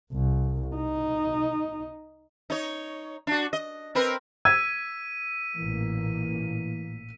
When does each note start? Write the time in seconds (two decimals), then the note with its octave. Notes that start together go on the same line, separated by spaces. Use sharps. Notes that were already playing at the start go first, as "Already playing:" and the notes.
0.12 C2
0.76 D#4
2.50 D#4 C#5
3.27 D4 F#4
3.53 D#5
3.95 C4 A#4 B4
4.45 E6 G#6 B6 D#7
5.56 A1 A#2 E3 A#3